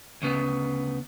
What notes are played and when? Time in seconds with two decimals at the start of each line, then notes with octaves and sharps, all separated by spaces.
0.22 D2 C#3 B3